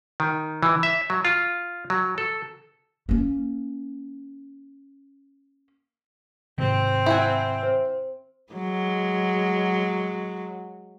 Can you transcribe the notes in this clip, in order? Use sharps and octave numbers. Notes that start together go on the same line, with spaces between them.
D#3
E3
E5
F#3
F4
F#3
A4
A#3 C#4
G#2 C3 D#3 C4
E4 F#5 G#5
C5
F#3 G#3